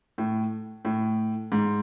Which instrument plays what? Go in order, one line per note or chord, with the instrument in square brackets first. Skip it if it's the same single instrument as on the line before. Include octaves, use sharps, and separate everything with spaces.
[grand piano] A2
A2
G#2